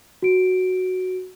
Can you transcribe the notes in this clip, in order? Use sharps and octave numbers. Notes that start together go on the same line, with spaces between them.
F#4 D7